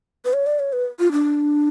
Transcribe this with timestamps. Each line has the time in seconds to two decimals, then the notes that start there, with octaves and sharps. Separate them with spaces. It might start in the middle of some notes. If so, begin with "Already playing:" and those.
0.25 B4
0.33 C#5
0.46 D5
0.59 C#5
0.73 B4
0.99 F4
1.12 D4